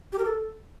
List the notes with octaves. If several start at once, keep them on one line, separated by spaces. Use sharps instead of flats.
G4
A#4
A4